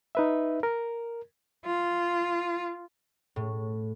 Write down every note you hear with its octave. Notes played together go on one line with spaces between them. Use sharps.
D#4 B4 E5
A#4
F4
A2